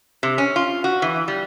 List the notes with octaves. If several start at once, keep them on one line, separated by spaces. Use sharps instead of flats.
C3
C#4
F4
F#4
E3
G3